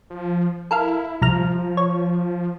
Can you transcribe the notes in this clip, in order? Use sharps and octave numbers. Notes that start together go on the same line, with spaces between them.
F3
E4 A4 A#4 F5
C2 F3 A#5 F6
C#5